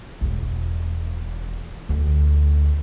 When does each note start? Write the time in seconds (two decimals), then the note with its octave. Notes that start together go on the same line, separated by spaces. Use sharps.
0.21 E1 E2
1.89 D2